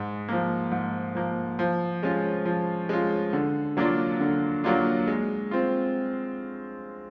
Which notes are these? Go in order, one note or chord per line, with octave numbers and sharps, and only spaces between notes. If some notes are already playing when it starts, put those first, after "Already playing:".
Already playing: G#2
F3 A#3
G#2
F3 A#3
F3
G#3 C#4 F4
F3
G#3 C#4 F4
D3
F#3 A#3 D4 F4
D3
F#3 A#3 D4 F4
G#3
C4 F4